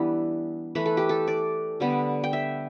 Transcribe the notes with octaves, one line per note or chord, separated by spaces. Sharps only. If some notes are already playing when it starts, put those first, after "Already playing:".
Already playing: E3 G3 B3 D4 E4
E3 A3 B4
A4
G4
A4
D5
D3 G3 B3
G5
E5